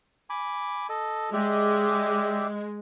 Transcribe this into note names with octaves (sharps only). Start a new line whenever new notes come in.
G#5 B5 D6
A4 D#5
G#3 G4 D5 E5